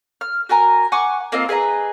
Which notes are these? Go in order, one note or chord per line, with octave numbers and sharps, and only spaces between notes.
F6
F#4 A#4 G#5 A#5
F#5 G#5 C#6 D6
A#3 C4 F4 D#5
G#4 B4 D#5 A#5